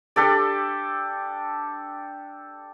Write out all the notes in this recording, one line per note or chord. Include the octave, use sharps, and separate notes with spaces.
D4 G4 A4 D5